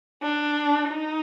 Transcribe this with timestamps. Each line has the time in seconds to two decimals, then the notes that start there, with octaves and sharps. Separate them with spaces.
0.23 D4
0.90 D#4